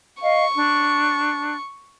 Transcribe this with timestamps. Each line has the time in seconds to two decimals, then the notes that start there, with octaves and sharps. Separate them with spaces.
0.21 D#5 F5 C#6
0.54 D4